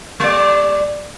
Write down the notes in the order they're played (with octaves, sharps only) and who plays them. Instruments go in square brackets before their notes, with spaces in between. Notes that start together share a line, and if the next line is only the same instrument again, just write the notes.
[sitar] G3 D5